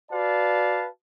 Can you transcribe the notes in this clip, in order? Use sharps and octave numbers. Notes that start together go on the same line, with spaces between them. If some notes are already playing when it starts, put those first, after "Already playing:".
F#4 B4 D5 F5 A5